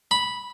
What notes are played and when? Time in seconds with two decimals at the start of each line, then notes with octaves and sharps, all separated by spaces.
0.11 B5